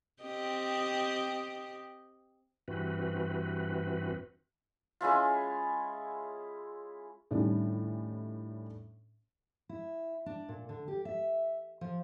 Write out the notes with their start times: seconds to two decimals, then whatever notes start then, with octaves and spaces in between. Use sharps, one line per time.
0.22 C4 G4 D#5
2.68 G2 E3 C4 F#4 B4
5.01 G#3 C#4 E4 F4
7.31 A2 D#3 G3 C#4 D4
9.69 E4
10.26 D4
10.49 A#2
10.69 D3
10.88 G4
11.05 E5
11.81 F3